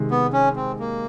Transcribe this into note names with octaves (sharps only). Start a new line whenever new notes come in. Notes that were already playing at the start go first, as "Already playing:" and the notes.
Already playing: C3 D#3 G#3
B3
C#4
C4
A#3